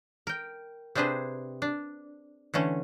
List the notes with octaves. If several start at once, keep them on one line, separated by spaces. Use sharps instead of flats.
A#4 G5
C3 C4 D4 G#4 B4 C5
D4
D3 E3 A3 C#4